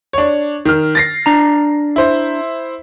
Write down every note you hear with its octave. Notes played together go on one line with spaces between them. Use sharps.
D4 C#5
D#3 F6
A6 A#6 C7
D4 A#5
E4 C5